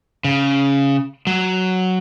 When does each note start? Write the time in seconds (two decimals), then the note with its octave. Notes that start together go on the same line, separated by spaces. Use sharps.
0.24 C#3
1.27 F#3